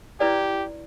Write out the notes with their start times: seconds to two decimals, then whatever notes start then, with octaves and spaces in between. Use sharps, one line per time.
0.20 E4 G4 B4 D5